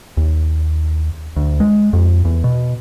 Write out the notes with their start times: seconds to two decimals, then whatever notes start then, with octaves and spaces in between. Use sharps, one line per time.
0.17 D#2
1.36 D2
1.60 G#3
1.93 F2
2.25 E2
2.44 B2